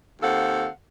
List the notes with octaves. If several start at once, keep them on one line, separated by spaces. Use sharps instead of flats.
D#2 C4 A4 F5 F#5